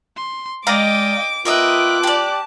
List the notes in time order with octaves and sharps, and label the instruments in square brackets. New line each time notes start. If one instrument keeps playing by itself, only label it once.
[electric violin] C6
[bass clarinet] G#3 [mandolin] D5 F5 A#5 [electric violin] D#5 G5 [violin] D6
[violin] B3 G5 [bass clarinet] F4 [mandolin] A#4 D#5 E5 [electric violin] D6 F#6
[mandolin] G4 D5 [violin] A5